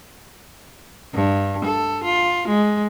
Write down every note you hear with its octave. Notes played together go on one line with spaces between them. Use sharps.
G2
A4
F4
G#3